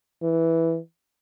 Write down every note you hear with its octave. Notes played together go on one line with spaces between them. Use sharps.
E3